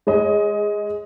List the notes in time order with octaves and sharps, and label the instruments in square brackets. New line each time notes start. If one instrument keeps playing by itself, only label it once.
[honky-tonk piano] G#3 C#5 D#5